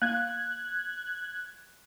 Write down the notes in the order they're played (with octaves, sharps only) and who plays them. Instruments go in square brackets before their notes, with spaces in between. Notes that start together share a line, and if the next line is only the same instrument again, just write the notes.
[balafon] A#3 [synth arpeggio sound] F#6 G#6